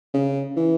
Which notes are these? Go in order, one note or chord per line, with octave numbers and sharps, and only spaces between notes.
C#3
E3